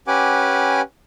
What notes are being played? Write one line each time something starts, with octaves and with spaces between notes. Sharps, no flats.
C#4 G4 B4 F#5 G#5 D6